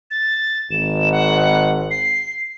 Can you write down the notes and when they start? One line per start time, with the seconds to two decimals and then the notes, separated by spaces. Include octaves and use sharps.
0.11 A6
0.71 G#1 E7
1.12 F#5
1.91 C7